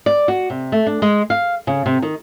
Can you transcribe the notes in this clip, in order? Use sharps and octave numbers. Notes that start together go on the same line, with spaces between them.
D5
F#4
C3
A3
D4
G#3
F5
C#3
C3
D#3